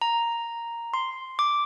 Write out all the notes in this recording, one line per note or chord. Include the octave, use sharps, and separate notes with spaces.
A#5
C6
D6